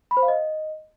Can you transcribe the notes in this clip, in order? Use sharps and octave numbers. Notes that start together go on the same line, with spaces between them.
B5
C5
F5
D#5